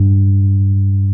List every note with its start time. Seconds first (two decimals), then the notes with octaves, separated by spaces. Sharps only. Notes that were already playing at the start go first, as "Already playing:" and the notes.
Already playing: G2